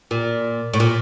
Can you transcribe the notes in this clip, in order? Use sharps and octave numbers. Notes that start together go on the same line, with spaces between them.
A#2
A2
A#2